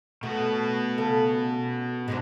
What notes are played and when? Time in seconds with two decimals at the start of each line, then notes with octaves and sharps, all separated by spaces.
0.23 B2 A3 B3
0.98 C#3 A4
2.08 G#2 G#3 C4 D4